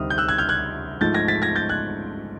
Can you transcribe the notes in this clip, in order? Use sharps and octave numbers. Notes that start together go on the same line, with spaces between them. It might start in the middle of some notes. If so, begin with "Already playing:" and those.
Already playing: D2 C3 D#3 G3 C4 D#6 F6
G6
E6 F#6
F#6 G#6
F6 G6
F#6 G#6
G#2 F3 A3 G6 A6
G#6 A#6
A6 B6
G#6 A#6
G6 A6
F#6 G#6